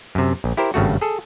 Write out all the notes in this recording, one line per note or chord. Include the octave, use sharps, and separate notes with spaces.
F#2 C3
A#1
E4 G4 A#4 C5
G#1 G2 C#3 A3 F#4
G#4 A4